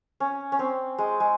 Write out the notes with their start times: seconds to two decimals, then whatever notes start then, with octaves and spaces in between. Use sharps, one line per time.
0.20 C#4
0.52 C#4
0.59 C4
0.98 G#3
1.20 G#3